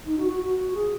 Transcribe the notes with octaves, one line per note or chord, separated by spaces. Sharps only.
D#4
F#4
F#4
F#4
G#4